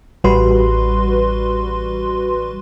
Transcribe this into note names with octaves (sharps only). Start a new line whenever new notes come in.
A1 G3 F#4 B4 C6